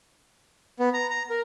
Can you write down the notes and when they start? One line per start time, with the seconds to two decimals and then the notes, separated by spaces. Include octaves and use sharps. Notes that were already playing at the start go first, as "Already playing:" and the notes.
0.79 B3
0.94 A#5
1.10 A#5
1.30 A#4